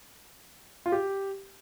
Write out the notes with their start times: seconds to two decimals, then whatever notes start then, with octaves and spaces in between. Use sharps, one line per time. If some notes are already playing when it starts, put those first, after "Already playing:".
0.86 F4
0.92 G4